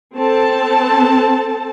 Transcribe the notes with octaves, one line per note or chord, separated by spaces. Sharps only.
C4 A4 A5